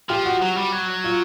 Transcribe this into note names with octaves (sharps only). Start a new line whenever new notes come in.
F3 G4
F#4
F#3
G3
F#3
F4